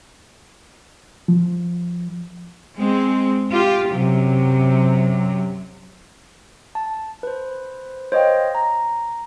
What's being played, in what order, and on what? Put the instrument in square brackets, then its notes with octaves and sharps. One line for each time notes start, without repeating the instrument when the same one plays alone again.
[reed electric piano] F3
[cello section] G#3 C4
F4 G4
F#2 C3 F#3
[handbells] A5
B4 C5
C5 C#5 D#5 F5 G5
A#5